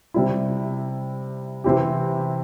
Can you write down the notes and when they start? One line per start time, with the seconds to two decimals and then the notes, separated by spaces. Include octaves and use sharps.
0.14 C3 G3 E4
1.64 C3 E3 C4 E4 G4